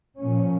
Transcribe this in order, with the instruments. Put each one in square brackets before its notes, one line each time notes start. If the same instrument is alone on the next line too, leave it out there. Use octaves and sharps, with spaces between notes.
[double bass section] A#2 F3 C#4